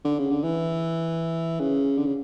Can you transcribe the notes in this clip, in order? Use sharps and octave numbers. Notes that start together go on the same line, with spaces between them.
D3
C#3
D3
E3
C#3
D3
C#3